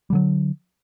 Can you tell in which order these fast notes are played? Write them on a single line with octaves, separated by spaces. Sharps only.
G3 D3 F#3